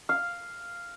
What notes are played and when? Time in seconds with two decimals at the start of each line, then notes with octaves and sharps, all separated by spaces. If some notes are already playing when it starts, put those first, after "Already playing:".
0.09 F5